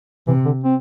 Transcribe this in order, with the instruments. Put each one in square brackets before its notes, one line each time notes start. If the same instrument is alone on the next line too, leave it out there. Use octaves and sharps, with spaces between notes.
[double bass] C3 [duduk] E3
[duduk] D3
C4